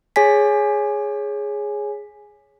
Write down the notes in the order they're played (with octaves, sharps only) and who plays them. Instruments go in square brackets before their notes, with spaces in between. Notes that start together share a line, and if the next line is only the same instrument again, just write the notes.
[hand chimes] G#4 C#5 G#5 B6